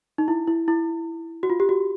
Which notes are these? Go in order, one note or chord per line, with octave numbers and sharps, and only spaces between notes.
D#4
E4
E4
E4
F#4
F4
G4
F#4